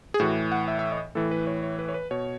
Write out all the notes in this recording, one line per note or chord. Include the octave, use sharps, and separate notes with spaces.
G#4
A2 E3 F#4
F#5
E5
E5
D#5
A2 E3 A4
B4
C#5
C#5
B4
C#5
B4
B2 C#5